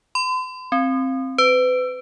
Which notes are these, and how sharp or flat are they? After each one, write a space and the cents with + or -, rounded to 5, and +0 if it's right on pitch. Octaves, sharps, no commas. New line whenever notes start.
C6 -45
C4 +10
B4 +35